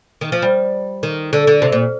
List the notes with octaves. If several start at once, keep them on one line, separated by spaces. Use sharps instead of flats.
D#3
F3
G3
D#3
D3
D3
C3
A#2